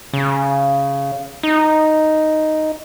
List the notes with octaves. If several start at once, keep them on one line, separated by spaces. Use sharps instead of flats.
C#3
D#4